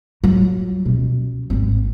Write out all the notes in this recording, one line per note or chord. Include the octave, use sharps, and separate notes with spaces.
F#3 F4
B2 C#4
G#1 C4